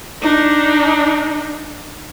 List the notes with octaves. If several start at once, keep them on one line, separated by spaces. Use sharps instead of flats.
D4 D#4